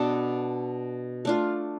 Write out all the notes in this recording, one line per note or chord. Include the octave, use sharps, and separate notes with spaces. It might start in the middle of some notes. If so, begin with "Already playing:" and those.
Already playing: B2 B3 D4 A4
A3 D4 F4